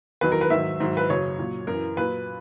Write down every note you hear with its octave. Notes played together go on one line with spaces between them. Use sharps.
E2 D#3 F#3 B4
A#4
B4
G#2 D#3 F#3 E5
G#2 D#3 F#3
B4
F#2 C#3 F#3 C#5
A#2 F#3
F#2 E3 A#4
A#2 F#3 B4